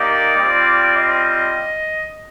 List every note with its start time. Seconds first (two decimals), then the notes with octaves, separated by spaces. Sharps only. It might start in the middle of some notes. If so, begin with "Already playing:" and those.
Already playing: A#3 D#4 G4 D5
0.37 G3 C4 F4
0.96 D#5